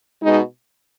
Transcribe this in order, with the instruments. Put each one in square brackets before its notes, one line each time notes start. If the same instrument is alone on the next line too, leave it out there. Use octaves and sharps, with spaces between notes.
[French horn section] B2 G#3 D#4